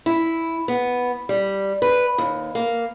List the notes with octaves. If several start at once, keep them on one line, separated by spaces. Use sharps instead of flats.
E4
B3
G3
B4
D#2
A#3